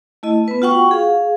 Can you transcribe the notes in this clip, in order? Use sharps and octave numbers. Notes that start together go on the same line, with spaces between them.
A3 E4 D#5
B3 B4
F4 F#4 F#5 G5 C#6
G#4 F5